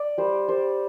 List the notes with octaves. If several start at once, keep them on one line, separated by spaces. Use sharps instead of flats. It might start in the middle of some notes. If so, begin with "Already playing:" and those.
Already playing: D5
G3 C5
G3 C5